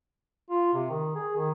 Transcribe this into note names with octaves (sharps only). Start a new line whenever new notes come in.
F4
C3
D#3
G#4
D#3